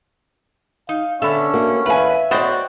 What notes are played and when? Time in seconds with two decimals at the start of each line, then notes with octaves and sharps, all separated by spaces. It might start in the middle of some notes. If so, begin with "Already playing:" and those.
0.89 D#4 F5
1.22 D3 B3 C#4 D4 E5
1.54 A#3 F#4
1.86 E2 B4 E5 F5 G#5
2.31 B3 F#4 C5 D5 D#5 G5